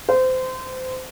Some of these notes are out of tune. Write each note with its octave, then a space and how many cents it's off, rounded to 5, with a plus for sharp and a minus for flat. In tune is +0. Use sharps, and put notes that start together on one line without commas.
C5 -25